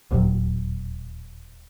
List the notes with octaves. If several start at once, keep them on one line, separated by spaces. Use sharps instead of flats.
D1 D#2 A#2 F#3